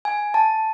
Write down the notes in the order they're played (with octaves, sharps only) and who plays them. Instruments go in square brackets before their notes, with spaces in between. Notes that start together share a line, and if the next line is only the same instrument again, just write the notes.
[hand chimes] G#5
A5